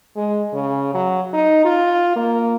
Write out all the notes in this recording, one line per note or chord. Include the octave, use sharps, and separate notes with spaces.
G#3
C#3
F#3
D#4
F4
A#3